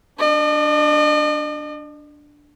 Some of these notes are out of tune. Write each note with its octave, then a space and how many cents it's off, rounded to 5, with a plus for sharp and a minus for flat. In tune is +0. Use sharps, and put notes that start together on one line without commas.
D4 +0 D#5 -45